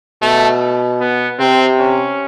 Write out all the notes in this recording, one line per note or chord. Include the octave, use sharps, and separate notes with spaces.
B2 A3
B3
C3 C4
C#4